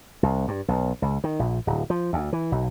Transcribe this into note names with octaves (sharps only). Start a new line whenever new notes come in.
C2
G2
B1
C#2
D#3
A#1
D1
F3
D2
E3
B1